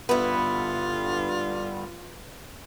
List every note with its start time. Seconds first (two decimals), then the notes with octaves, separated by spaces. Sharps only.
0.09 G2 D3 G3 B3 E4 F4 B4